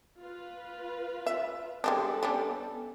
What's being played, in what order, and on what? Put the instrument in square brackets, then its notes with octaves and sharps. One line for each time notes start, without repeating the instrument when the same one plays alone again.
[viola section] F4 B4
[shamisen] E5
[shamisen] G3 G#3 D4 [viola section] B3 A4
[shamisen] G3 C#4 D4